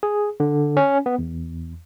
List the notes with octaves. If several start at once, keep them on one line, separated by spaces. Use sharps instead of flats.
G#4
D3
C#4
B3
E2